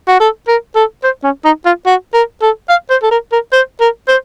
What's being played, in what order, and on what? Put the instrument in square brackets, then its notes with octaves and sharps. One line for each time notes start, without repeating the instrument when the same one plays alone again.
[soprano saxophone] F#4
A4
A#4
A4
C5
C#4
D#4
F4
F#4
A#4
A4
F5
C5
A4
A#4
A#4
C5
A#4
C5